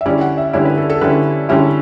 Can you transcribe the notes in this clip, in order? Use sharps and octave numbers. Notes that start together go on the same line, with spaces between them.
E5
D3 G3 C#4 E4 D5
F#5
E5
D3 G3 C#4 E4 C#5
B4
A4
A4
D3 G3 C#4 E4 B4
D3 G3 C#4 E4